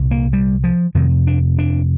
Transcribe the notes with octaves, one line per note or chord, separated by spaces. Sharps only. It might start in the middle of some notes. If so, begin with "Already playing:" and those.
Already playing: C2 A#2
A#3
G3
F3
F2 C3 D#3
D4
D4